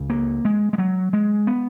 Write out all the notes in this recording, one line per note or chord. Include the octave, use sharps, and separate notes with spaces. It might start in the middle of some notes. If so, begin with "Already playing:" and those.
Already playing: C#2 C#3
A#3
G#3
G#3
F#3
G#3
B3